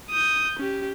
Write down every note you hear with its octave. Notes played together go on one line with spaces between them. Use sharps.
D#6 G6
C#4 G4